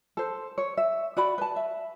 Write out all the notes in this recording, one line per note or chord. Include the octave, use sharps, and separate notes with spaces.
A4 C5
C#5
E5
F#4 D5 B5
B4 A5
E5